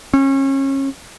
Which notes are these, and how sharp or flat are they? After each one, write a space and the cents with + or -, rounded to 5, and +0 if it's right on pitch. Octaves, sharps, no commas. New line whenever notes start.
C#4 -30